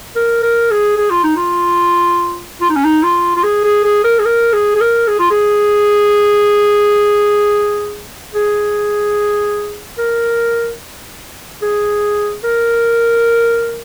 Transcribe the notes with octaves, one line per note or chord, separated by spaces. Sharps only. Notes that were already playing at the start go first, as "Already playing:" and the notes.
A#4
A#4
G#4
G#4
F4
D#4
F4
F4
D#4
C#4
D#4
F4
F4
G#4
G#4
G#4
A#4
G#4
A#4
G#4
G#4
A#4
G#4
F4
G#4
G#4
A#4
G#4
A#4